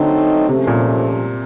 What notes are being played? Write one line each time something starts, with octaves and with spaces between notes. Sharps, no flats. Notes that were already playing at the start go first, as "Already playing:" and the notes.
Already playing: D3 F#3 A3 C4 D#4
G#2 C3 F3 A3 C#4
A#2